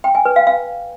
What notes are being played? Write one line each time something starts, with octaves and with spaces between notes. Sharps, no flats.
G5
G#5
B4
F5
F5